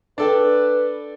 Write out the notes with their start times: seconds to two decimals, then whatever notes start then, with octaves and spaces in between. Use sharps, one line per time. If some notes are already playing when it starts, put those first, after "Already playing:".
0.18 D4 A4 B4 G5